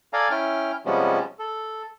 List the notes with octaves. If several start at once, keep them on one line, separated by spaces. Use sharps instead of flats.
A4 D5 F5 G#5 A#5
C#4 E4 G5 F6
C3 F3 G3 G#3 B3 C#4
A4